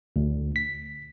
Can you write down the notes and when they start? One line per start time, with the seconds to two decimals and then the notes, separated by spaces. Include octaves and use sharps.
0.16 D2
0.56 B6